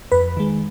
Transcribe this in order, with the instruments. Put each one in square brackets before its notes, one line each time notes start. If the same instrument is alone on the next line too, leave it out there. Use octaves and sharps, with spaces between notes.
[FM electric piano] F2 B4
D#3 G#3